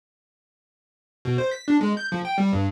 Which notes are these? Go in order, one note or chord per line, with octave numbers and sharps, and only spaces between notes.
B2
C5
B6
D4
G#3
G6
F3
G5
G3
G2